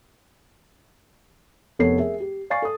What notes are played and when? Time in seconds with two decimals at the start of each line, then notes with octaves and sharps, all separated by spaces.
1.79 F1 B3 A4 A#4 C#5 C7
1.98 G#4 A#4 E5
2.20 G4
2.50 D5 F5 G#5 C#6 A6 C7
2.62 A4 D#6